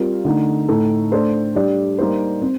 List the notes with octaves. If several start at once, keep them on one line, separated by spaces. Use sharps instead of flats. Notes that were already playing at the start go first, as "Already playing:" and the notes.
Already playing: G3 C4 F4 A#4
D3 A3 D#4
A2 A3 D#4 A4
A3 D4 A4 C5
G3 D4 G4
G3 A#3 D#4 G4 C5
C4